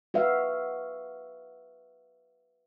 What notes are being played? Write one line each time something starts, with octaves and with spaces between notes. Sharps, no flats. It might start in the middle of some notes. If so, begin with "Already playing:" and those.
F#4 B4 E5 F5